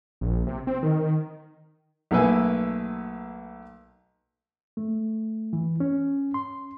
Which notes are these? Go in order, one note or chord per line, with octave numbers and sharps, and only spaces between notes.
A#1
C3
C4
D#3
B1 A3 A#3 A4 B4 G#5
A3
E3
C#4
C6